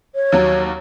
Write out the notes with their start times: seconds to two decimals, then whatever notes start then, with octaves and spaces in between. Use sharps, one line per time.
0.15 C#5
0.32 D#2 F#3